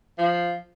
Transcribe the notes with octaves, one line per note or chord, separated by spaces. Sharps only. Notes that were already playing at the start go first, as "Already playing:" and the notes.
F3